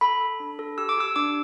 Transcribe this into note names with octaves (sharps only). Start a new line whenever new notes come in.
A4 B5
A4
D4
A4
G4 E6
D6
G4 E6
D4 D6